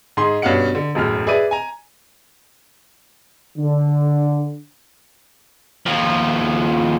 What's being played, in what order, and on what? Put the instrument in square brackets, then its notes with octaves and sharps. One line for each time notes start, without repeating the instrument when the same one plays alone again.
[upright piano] G#2 G#4 C6
G2 B2 C#4 F5 F#5 C#7
D3
E1 F#2 A2 F6
G#4 B4 D5 E5 D#7
G#5 A#5
[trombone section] D3
[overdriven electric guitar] D#2 F3